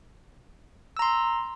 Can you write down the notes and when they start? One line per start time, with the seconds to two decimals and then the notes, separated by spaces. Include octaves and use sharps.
0.97 E6
0.99 A#5
1.02 C6